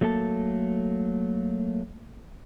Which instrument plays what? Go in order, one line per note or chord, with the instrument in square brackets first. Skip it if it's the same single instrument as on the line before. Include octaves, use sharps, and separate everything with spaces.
[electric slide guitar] F#3 A3 A#3 A4 A5